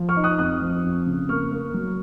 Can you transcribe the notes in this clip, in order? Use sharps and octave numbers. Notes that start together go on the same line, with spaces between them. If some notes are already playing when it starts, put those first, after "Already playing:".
Already playing: F3
C#6 F6
D#4
D#6 F#6
F2 D#6 F#6
F3
F2
C#3
A#3 C#6 F6
A#3
F#3